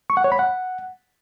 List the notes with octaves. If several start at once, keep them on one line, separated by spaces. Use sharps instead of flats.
C#6
F#5
C#5
B5
F#5